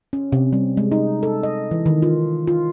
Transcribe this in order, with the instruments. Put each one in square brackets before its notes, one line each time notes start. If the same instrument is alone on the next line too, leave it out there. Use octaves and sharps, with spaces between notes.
[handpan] C#4
C3
G3
G#3
D#4
A4
D#5
E3
D#3
F4
F4